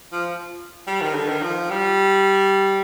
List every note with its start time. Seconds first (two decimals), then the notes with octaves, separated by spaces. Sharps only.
0.12 F3
0.87 G3
1.01 D#3
1.14 D3
1.28 D#3
1.42 F3
1.70 G3